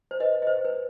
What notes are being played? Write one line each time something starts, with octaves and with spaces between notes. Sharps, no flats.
C5
B4 D#5
D#5
C5
B4